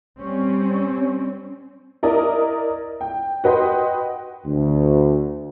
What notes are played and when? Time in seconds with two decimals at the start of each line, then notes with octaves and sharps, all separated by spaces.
0.20 G3 C4 C#4
2.03 E4 A#4 D5 D#5
3.01 G5
3.44 F#4 B4 D#5 G5 C6
4.43 D2